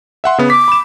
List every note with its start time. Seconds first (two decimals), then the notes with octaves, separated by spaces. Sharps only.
0.24 E5 F#5 C6
0.38 C#3 B3
0.50 D6 B6
0.68 B5 E7